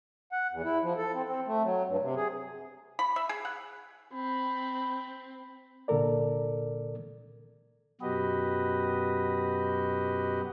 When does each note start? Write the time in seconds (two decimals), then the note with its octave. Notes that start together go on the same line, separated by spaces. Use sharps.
0.32 F#5
0.51 E2
0.64 E4
0.82 F3
0.97 A4
1.14 C4
1.27 C4
1.47 A3
1.63 F#3
1.87 G2
2.01 C3
2.16 G#4
2.99 B5
3.16 E5
3.29 G#4
3.45 F#5
4.14 C4 B5
5.88 C2 A#2 D3 A4 A#4 D5
8.01 F#2 B2 F#4 G4 B4 D#5